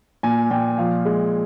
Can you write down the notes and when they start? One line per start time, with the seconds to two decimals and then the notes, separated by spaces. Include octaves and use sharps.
0.23 A#2 G#5
0.50 A#2 G5
0.78 F3 F5
1.05 G#3